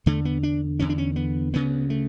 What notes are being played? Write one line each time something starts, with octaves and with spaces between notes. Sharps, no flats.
E2 D3 A3
B3
D4
E2 D3 C#4
D4
C#4
B3
D2 C#3 B3
A3